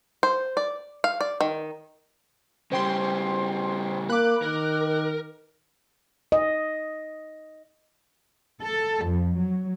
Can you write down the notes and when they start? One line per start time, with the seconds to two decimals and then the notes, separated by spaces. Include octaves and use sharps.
0.23 C5
0.57 D5
1.04 F5
1.21 D5
1.41 D#3
2.72 C#3 G3 C5 G5 C6
4.10 A#3 B5 D6 F#6
4.42 D#3 A#4
6.32 D#5
8.62 A4
9.04 F2
9.36 F#3